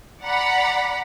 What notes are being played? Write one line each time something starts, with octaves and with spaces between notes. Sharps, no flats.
D5 F#5 A#5 B5